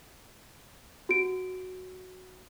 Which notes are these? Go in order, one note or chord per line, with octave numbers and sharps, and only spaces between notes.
F#4 D7